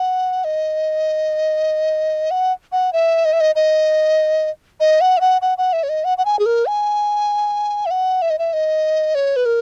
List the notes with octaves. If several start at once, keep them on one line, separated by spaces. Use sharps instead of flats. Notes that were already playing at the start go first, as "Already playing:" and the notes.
Already playing: F#5
D#5
F#5
F#5
E5
D#5
E5
D#5
D#5
D#5
F#5
E5
F#5
F#5
F#5
E5
C#5
D#5
F#5
F#5
G#5
G#4
A#4
G#5
E5
F#5
E5
D#5
E5
D#5
C#5
B4
A#4